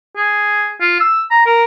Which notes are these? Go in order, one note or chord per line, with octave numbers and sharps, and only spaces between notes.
G#4
F4
E6
A#5
A#4